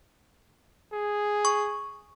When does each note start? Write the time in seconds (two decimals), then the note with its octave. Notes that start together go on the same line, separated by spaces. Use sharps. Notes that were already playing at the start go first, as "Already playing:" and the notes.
0.93 G#4
1.45 C#6